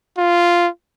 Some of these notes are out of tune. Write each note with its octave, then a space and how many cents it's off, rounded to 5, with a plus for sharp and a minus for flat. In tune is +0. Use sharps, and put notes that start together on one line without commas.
F4 -5